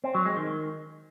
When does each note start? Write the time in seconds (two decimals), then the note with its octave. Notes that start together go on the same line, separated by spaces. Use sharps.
0.04 C4
0.15 F#3
0.26 G#3
0.37 D#3